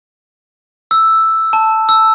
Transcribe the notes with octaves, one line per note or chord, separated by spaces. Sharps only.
E6
A5
E6